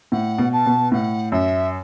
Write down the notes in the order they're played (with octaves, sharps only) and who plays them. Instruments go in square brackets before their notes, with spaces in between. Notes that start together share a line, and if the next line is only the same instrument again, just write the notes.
[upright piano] A2 [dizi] F#5
[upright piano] B2
[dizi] A5
[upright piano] B2
[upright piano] A2 [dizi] F#5
[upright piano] F#2 [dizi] E5